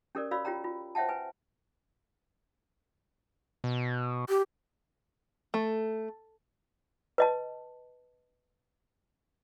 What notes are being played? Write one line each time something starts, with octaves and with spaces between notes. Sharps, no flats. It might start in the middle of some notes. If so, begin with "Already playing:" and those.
C#4 G4 A4 A#4 C#5 D5
F#4 C#5 D5 F5 B5 E6
F4 G4 C#5 G5 A#5
F4
C5 C#5 E5 F#5 G5 A5
B4 G#5
B2
G4
A3
B4 D#5 A5